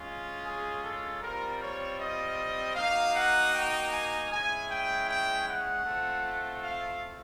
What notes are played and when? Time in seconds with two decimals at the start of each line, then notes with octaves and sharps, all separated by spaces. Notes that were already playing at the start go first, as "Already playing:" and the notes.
Already playing: G#3 C#4 F4
0.45 G#4
0.83 A4
1.22 G3 C4 F4 A#4
1.61 C#5
1.99 D#5
2.76 A#3 D#4 F#4 F5
3.15 F#5
3.54 G5
3.92 G#5
4.31 G#3 C#4 E4 G#5
4.70 G5
5.08 G5
5.47 F#5
5.85 A3 C4 F4
6.62 F5